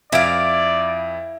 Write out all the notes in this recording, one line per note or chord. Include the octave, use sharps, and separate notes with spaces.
F2 E4 D5 F5 D7